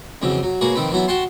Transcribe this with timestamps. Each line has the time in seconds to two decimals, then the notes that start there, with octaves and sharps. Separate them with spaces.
0.22 F2 C#3 E3 F#3
0.43 F#3
0.61 A#3 F#4 G#4 B4 C#5
0.75 D#3 F3 C4 B4
0.91 E3 F#3 B3 E4
1.08 F#4 F#5 G5 A5 C6